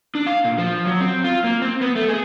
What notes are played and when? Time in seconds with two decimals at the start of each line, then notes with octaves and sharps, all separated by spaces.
0.15 D4
0.26 F5
0.45 A#2
0.58 F3
0.86 F#3
1.01 C4
1.24 F4
1.44 A#3
1.62 C4
1.81 B3
1.96 A3
2.09 G#4